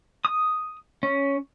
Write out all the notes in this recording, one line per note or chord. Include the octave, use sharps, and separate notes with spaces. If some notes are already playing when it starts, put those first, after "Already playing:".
D#6
C#4